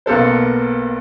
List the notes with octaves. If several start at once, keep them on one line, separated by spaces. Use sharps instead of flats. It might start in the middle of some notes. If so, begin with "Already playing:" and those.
B1 A#3 B3 A4 C5